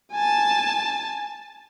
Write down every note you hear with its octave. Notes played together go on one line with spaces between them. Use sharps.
G#5 A5